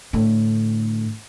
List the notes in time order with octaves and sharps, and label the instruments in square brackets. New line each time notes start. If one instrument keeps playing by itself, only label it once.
[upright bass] A2 D3